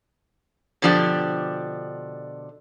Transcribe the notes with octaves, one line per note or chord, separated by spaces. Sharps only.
B2 D3 F3 D4 G4